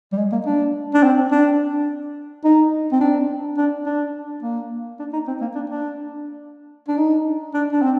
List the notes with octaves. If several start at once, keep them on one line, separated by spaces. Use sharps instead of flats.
G3
G#3
A#3
D4
D4
C4
D4
D#4
C4
D4
D4
D4
A#3
D4
D#4
C4
A#3
D4
D4
D4
D#4
D4
D4
C4